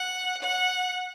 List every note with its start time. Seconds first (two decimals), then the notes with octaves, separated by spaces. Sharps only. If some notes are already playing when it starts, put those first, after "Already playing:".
Already playing: F#5
0.42 F#5